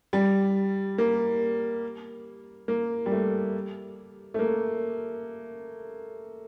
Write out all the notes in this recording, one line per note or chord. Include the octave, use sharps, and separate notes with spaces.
G3
A#3
A#3
G3
A3
A3
A#3